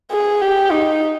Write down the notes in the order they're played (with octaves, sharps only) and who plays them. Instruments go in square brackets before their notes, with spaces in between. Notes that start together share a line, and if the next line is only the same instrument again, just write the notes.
[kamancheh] G#4
G4
D#4